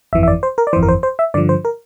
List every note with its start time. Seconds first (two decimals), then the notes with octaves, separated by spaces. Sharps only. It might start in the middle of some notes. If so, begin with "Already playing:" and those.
0.13 G1 F2 E3 E5
0.23 E5
0.28 D5
0.43 C5
0.58 A#4
0.67 D5
0.73 E3 C5
0.76 G1 F2
0.83 A#4
0.88 C5
1.03 C5
1.19 E5
1.34 G2 D3 F3 D5
1.49 C5
1.65 A#4